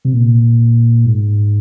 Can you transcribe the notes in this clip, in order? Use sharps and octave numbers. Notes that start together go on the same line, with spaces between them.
C3
A#2
G#2